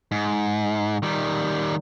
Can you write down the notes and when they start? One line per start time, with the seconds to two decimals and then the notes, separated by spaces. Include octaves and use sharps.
0.12 G#2
1.03 D#3 G3